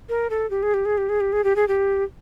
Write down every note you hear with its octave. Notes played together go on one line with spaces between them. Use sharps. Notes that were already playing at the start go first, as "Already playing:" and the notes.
A#4
A4
G4
G#4
G4
G#4
G4
G#4
G4
G#4
G4
G#4
G4